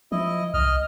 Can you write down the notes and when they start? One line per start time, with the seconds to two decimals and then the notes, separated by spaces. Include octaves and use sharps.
0.12 F3 E4 D#5
0.54 C2 D#5 F6